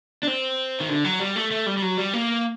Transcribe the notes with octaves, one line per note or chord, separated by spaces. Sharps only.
D4
C4
D#3
D3
F#3
G3
A3
A3
G3
G3
F#3
G3
A#3